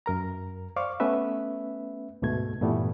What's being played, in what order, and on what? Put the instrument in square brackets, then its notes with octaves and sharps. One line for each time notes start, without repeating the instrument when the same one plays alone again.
[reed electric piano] F#2 A#4 A#5
C5 D5 F5 C#6 D6
A3 B3 C#4 B4 E5
D2 G#2 B2 A3 G#6
G2 A#2 E3 G3 A3 B3